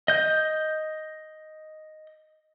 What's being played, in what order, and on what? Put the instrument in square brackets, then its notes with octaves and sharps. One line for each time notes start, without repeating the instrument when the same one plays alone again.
[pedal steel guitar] D#5 G6